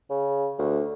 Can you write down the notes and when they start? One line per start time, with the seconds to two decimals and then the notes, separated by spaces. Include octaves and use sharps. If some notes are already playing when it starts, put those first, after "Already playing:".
0.10 C#3
0.58 D2